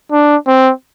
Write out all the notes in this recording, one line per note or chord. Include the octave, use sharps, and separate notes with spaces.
D4
C4